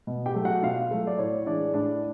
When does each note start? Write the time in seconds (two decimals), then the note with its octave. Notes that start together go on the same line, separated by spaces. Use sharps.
0.07 B2
0.26 G4 G5
0.35 F#3 A3
0.45 F#4 F#5
0.63 B2 F4 F5
0.91 F#3 A3
1.07 D5
1.19 A2 C#5
1.46 E3 G#3 D4 D5
1.74 A2 D4 D5